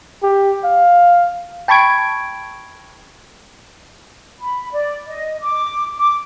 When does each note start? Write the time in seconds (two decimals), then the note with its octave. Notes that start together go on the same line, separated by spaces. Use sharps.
0.23 G4
0.64 F5
1.68 G5 A5 B5 C#6 G#6 D7
4.39 B5
4.71 D5
5.07 D#5
5.41 D6
5.98 D6